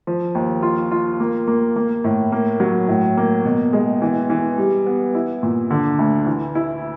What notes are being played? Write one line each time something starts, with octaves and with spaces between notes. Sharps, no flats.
F3
D#2
F4
F4
A#3
A#3
A#3
A2
A#3
F#3
A2
A#3
B2
G#3
E3
E3
G3
B3
E4
A#2
D3
D2
E3
E4